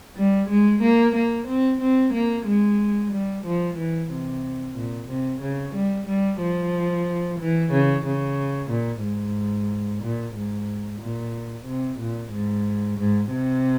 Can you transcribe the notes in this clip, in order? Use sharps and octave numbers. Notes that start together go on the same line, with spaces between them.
G3
G#3
A#3
A#3
C4
C4
A#3
G#3
G3
F3
E3
C3
A#2
C3
C#3
G3
G3
F3
E3
C#3
C#3
A#2
G#2
A#2
G#2
A#2
C3
A#2
G#2
G#2
C3